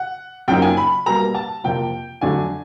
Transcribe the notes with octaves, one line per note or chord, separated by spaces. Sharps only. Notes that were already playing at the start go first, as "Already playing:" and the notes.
Already playing: F#5
F#2 C#3 F3 A#3 D#4 G5
G#5
B5
B2 G3 A#3 A#5
A5
F2 C3 F3 A#3 G5
F2 D3 F#3 A3 D4 G#5